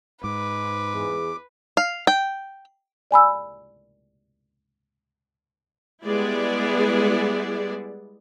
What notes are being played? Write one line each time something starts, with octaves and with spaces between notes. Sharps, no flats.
G#2 B4 D6
E2 E3 G#4
F5
G5
D5 G#5 B5 E6
G3 G#3 B3 E4 G#4 D5